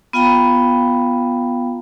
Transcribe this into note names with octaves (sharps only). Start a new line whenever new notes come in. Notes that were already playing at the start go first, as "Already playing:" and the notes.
B3 F4 F5 G5 A#5 B5